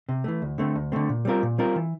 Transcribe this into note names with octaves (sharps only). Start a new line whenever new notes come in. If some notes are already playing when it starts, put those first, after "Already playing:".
C3
E3 A3
D2
D3 A3 C4
D2
D3 A3 C4
A#2
G3 C4 F4 A#4
A#2
G3 C4 F4 A#4
E3